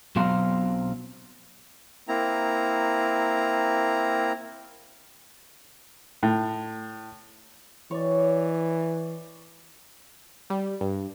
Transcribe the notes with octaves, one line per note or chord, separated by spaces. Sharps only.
B1 B2 F#3 C4 F5 C6
A#3 C4 E4 A#5
A2
E3 C#5 D5
G3
G2